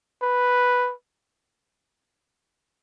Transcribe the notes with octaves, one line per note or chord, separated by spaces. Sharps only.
B4